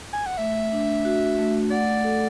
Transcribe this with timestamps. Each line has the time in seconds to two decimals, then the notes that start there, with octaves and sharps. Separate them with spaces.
0.13 G#5
0.26 F#5
0.38 A3 E5
0.72 D4
1.05 F#4
1.39 A3
1.70 D5 F#5
2.04 A4